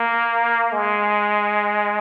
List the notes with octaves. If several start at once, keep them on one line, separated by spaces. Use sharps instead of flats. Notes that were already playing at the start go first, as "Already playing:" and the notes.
Already playing: A#3
G#3